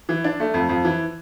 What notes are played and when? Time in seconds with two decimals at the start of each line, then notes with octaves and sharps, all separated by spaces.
0.09 E3
0.24 D4
0.40 A3
0.54 F2
0.69 F2
0.85 E3